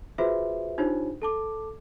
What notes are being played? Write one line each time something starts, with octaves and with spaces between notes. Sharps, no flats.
F4 F#4 G#4 B4 C5 E5
D4 D#4 F4 G4 C5 C#5
A4 A5 D6